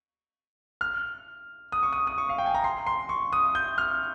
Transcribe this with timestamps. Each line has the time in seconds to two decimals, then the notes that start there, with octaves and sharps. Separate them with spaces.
0.81 F6
1.72 D#6
1.83 C#6
1.93 D#6
2.07 D#6
2.18 C#6
2.29 F5
2.38 G5
2.46 G#5
2.54 A#5
2.64 C6
2.87 C6
3.09 C#6
3.33 D#6
3.55 G6
3.78 F6